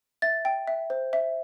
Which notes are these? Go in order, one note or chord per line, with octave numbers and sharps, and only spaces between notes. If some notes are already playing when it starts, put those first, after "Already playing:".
E5 A6
G5
E5
C5
E5